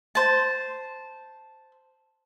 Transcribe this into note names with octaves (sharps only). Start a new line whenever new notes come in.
C5 A5